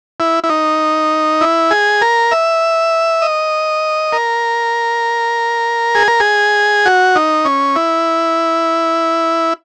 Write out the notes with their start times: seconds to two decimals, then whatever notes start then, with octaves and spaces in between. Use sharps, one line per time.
0.20 E4
0.44 E4
0.49 D#4
1.41 E4
1.71 G#4
2.01 A#4
2.31 E5
3.22 D#5
4.12 A#4
5.95 G#4
6.08 A#4
6.20 G#4
6.86 F#4
7.15 D#4
7.45 C#4
7.76 E4